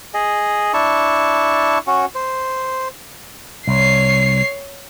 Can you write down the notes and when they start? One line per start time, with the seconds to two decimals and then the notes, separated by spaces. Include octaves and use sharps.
0.14 G#4 D#5
0.74 D4 E4 A5 C#6
1.87 C#4 F#4
2.15 C5
3.68 C2 C#5 C7